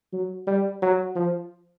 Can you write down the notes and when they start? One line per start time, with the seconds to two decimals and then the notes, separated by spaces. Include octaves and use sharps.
0.13 F#3
0.47 G3
0.82 F#3
1.16 F3